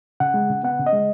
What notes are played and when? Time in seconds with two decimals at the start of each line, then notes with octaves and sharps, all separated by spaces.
0.20 C#3 F#5
0.34 G#3
0.50 C#3
0.63 B3 F#5
0.79 C#3
0.86 D#5
0.93 G#3